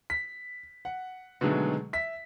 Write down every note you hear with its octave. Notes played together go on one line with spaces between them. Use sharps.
B6
F#5
B2 D3 D#3 F#3 G#3 A3
E5 B6